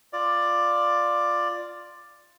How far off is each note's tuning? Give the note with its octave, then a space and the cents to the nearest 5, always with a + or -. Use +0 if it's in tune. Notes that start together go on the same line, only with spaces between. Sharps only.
F4 +0 D5 +10